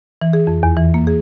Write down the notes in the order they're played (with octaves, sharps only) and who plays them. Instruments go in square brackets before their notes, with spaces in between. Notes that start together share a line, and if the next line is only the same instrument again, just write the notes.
[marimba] E3
G#4
F2
E2
E3
A#3
G#4